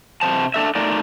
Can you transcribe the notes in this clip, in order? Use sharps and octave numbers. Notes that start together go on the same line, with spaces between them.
C3 E3 C5 A5
D4 A4 E5
A3 D#4 A#4 D5